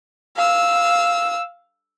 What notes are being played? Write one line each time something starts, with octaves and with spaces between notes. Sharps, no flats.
F5 E6